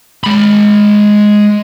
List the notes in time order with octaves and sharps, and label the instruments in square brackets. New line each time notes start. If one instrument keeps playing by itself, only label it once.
[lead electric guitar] G#3 B5